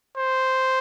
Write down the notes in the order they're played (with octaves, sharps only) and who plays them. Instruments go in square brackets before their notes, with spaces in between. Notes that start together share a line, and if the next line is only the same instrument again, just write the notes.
[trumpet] C5